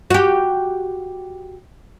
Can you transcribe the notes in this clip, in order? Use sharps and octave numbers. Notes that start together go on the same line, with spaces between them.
F#4 G4